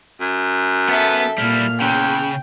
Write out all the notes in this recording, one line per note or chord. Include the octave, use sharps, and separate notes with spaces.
F#2
B3 A4 E5
A#2 G3 E4 F6
E2 C#3 G5